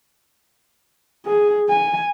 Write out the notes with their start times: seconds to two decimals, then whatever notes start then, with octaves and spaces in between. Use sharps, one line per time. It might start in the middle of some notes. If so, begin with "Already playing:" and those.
1.26 G#4
1.69 G#5